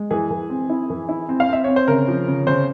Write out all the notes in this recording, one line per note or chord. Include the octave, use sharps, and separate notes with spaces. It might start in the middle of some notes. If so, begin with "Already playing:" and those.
Already playing: G#3
E3 G#4
E3
C4
E4
E3
E4
C4
F5
C4 E5
C4 C#5
C5
C#3 A#4
F3
C#3
C#3 C5